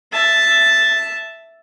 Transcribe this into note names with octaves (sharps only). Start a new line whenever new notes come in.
E5 A5